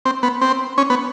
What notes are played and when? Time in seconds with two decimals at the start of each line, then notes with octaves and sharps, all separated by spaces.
0.05 C4
0.23 B3
0.41 C4
0.78 C#4
0.90 B3